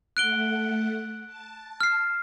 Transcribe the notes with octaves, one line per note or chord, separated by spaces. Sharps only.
A3 F#5 F#6 D7 G7
A5
F6 C7